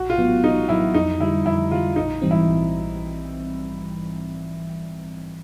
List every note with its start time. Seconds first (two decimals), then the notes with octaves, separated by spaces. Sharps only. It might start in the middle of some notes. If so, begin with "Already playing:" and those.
Already playing: A#1 F#4
0.10 F4
0.18 A2 F#3 B3
0.44 A#1 D#4
0.69 A2 F#3 B3 E4
0.94 F2 D#4
1.20 D3 G3 E4
1.45 F2 E4
1.71 D3 G3 F4
1.96 A#1 D#4
2.22 G#2 E3 G3 C4
2.31 E4
2.48 A#1